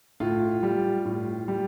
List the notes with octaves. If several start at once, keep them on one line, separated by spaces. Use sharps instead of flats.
A2 F4
G3
A2
G3